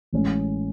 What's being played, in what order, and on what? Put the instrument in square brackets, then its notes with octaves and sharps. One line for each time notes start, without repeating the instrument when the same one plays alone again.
[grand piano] A1 A2 G#3 C#4